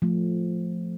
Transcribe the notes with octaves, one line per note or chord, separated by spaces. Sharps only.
F3 A3